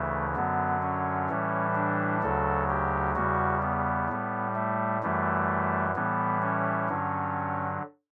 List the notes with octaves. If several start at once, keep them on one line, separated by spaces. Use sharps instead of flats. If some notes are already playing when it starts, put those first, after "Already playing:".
Already playing: D2 C#3 E3 A3
F#2 D3 F#3 B3
C#4
A2 E3 G3
D4
D2 C#3 F#3 A4
G4
E2 C#3 G3 F#4
B3
A2 G3
A3
F#2 E3 G3 A3
A2 E3 G3 B3
C#4
G2 D3 F#3